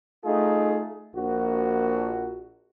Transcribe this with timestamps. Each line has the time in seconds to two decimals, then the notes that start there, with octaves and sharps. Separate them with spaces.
0.25 A3 D#4 F4 G#4
1.15 A#1 F#4